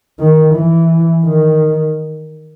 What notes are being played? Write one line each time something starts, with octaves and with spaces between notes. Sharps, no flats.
D#3
E3
D#3